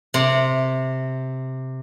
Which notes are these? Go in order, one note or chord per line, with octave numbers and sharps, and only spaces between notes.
C3 C4